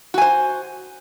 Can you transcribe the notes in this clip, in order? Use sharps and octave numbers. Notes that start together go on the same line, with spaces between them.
F#4 C5 G#5